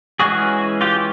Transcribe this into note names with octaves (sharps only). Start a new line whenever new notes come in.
E3 G#3 C#4 F#4 G#4
F4 G4